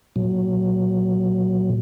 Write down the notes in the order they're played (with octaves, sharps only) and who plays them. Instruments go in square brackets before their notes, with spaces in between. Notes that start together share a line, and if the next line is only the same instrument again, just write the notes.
[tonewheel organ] A#2 F#3